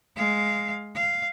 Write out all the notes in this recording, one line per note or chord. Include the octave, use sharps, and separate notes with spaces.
G#3 F5
F5